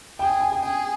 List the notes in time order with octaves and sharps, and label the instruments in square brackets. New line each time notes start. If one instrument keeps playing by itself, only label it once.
[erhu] G#4 [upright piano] G5
[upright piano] G5
G#5
G5
[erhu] G#4 [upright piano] G5